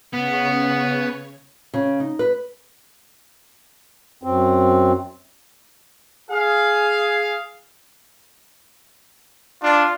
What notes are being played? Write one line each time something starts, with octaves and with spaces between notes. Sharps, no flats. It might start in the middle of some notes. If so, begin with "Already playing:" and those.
C#3 B3 C#5
C#3
D#4
B4
F#2 C4
G#4 F5
D4 F4